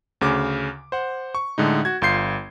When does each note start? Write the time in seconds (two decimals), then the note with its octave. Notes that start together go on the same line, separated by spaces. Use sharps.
0.21 D2 C#3 D6
0.92 C5 F#5
1.35 C#6
1.58 A2 D3 G#3 D#4
1.85 F#4 G#6
2.02 G1 F4 C6 G6 C7